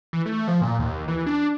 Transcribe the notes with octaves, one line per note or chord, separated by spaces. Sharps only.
E3
A3
F3
A#2
D#2
E3
D4